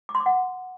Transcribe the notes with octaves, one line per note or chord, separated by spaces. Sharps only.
D6
C6
D6
F#5